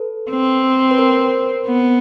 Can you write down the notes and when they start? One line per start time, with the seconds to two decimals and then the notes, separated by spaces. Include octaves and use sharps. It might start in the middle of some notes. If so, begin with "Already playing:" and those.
Already playing: A4 B4
0.30 C4
0.91 B4
0.98 A#4 C5
1.67 B3